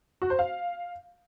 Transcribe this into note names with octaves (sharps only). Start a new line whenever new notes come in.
F#4
C5
F5